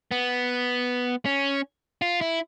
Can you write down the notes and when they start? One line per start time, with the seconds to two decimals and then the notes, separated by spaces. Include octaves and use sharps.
0.11 B3
1.26 C#4
2.02 F4
2.21 E4